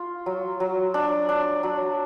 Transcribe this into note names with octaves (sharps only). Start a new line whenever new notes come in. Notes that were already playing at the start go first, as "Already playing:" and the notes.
Already playing: F4
F#3
F#3
D4
D4
F#3